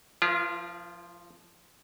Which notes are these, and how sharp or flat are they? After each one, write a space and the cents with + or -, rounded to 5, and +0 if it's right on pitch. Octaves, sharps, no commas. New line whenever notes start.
F3 +0 F4 -45 B4 -45